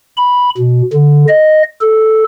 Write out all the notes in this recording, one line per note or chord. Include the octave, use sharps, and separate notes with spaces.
B5
B2
D3
D#5
A4